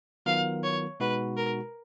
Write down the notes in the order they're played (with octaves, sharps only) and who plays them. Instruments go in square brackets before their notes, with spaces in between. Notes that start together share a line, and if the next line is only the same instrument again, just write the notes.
[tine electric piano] D#3 F#3 B3 F4 A#4 [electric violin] F5
[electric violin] C#5
[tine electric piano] B2 G#3 D#4 F#4 [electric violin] B4
[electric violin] A#4